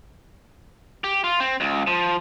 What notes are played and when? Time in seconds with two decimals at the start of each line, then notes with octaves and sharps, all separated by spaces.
1.04 G4
1.24 F4
1.40 C4
1.61 C#2
1.87 F3